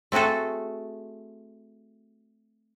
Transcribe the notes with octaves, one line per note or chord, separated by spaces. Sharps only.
A3 C4 F#4 G#4 A4